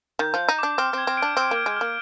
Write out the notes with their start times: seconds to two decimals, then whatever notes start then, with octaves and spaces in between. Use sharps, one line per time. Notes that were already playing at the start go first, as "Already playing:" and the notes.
0.19 D#3 G6
0.34 F3 G6
0.48 D#4
0.59 D4 D6
0.78 C4 F6
0.93 C4 G#6
1.07 C4
1.17 D4 D7
1.37 C4 F6
1.51 A#3 F6
1.66 G#3
1.77 A#3 F6